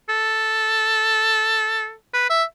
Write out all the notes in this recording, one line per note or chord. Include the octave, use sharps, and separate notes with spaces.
A4
B4
E5